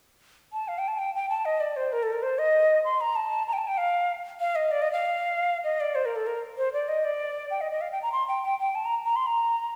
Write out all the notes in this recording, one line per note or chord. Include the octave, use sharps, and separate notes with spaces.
A5
F5
G5
A5
G5
G5
A5
D#5
D5
C5
A#4
A4
A#4
C5
D#5
C6
A#5
A5
A#5
G5
A5
G5
F5
F5
D#5
D5
D#5
F5
D#5
D5
C5
A#4
A4
A#4
C5
D5
D#5
D5
G5
D#5
D#5
F5
G5
A#5
C6
G5
G5
G5
A5
A#5
A#5
C6
A#5